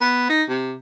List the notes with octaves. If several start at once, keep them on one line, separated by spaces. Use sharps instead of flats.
B3
D#4
C3